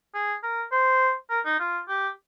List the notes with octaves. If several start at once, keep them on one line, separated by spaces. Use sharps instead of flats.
G#4
A#4
C5
A#4
D#4
F4
G4